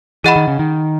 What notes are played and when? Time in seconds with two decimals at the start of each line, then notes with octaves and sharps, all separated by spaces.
0.24 E3 G#4 D#5 F#5 B5
0.36 D#3
0.48 C#3
0.59 D#3